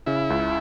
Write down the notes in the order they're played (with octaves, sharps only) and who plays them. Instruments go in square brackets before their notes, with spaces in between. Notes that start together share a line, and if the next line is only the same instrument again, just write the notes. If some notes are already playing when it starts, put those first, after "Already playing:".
[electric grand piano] C#3 [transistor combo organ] E4
[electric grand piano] C#2